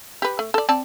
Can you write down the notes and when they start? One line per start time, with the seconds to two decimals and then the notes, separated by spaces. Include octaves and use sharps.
0.22 G4 B4
0.39 A3
0.54 A4 D5
0.69 C4 D5 A5